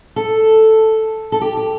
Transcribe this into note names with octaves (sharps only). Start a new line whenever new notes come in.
A4
A4
G4
G4